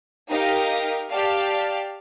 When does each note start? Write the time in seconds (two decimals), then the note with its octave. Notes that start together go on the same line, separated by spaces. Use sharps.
0.30 D#4 G4 A#4 F5
1.10 G4 D5 F5 A5